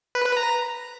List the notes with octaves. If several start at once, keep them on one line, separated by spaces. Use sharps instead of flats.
B4
B4
A#5